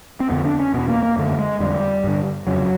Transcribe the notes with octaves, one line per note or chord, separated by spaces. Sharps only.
C4
F2 D3 B3
D4
C#4
E2 B2 B3
A#3
A#3
F#2 D3 A3
G#3
F2 D3 G3
G2 D3
F2 C#3 F#3